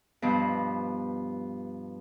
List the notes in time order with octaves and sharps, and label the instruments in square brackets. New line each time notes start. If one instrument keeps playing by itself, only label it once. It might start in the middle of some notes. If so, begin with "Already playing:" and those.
[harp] G2 B2 F3